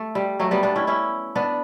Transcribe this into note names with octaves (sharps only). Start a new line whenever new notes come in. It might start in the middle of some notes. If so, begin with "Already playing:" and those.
Already playing: A3
G3
F#3 A3
G3 B3
B3 D4
C#4 E4
C#4 E4
B3 D4